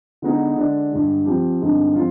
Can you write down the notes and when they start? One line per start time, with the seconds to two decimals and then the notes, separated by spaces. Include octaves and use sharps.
0.22 D3 G#3 B3 D#4 G#4
0.57 D3 G#3 D4
0.92 G2 D3 G#3
1.25 F3 C4 G4
1.60 G2 D3 G#3 C4 D#4
1.95 F3 C4 F4